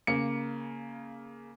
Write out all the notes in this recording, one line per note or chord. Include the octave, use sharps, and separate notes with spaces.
C#3 A#3 C#7